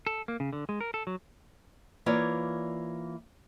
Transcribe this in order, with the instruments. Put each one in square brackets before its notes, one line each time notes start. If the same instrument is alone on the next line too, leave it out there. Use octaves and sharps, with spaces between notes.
[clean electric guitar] A4
A#3
C#3
D3
G#3
A#4
A4
F#3
[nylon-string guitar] E3 A#3 F4 C#5 D5